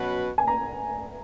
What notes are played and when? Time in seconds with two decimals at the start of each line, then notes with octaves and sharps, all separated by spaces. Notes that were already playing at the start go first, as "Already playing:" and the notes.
Already playing: B2 F#3 C#4 F#4 B4
0.38 G#5
0.47 A#5